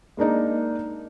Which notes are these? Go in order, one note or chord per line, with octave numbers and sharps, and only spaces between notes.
G#3 A#3 D4 D#4